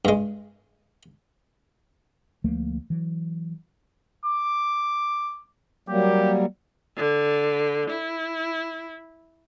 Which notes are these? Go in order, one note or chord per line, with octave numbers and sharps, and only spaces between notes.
G2 G#3
D2 F3 A3 A#3
E3 F#3
D6
F#3 G3 A#3 G4
D3
E4